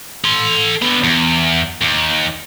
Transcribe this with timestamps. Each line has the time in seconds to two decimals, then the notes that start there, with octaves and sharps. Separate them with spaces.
0.24 A4 C6
0.82 D3 B3
1.04 E2
1.82 D#2